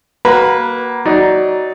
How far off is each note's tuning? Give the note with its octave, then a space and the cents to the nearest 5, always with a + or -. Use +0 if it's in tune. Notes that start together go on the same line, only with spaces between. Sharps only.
A#3 +10 F#4 +25 B4 -10
F#3 +15 D#4 +10 D5 +0